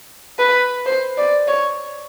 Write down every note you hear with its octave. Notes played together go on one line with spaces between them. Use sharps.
B4
C5
D5
C#5